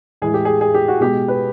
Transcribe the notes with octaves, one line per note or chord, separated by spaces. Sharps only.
A2 E3 G#3 G#4
G4
G#4
G#4
G4
F#4
B2 G#3 G4
B4